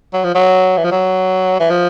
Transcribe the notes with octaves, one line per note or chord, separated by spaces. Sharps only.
F#3
F3
F#3
E3
F3
F#3
E3
F3